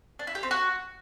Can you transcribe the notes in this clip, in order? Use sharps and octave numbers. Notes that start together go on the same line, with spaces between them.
D4
E4
G4
C4
F#4